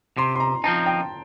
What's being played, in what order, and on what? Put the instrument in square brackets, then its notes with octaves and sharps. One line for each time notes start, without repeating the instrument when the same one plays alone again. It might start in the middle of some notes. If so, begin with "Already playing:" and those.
[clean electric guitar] C3 [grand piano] C6
[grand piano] C6
A#5
[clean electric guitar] F3 C4 D#4 [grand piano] A5
[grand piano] G5